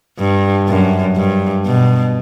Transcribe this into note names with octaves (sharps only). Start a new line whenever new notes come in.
G2
F#2
G2
B2